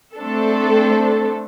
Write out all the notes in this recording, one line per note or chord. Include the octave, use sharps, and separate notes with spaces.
A3 C4 D4 A4